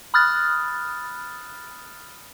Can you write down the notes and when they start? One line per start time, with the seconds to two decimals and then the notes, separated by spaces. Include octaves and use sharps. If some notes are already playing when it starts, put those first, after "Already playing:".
0.14 B5 D#6 F6 F#6 A6